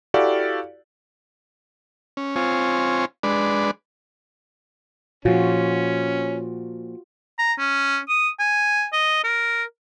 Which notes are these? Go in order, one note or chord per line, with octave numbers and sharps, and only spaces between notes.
E4 F#4 G4 A4 D5 F5
C#4
C4 F4 C#5 G#5
G#3 D4 B4 D5
A#2 F3 C#4 F4 F#4
A#5
C#4
D#6
G#5
D#5
A#4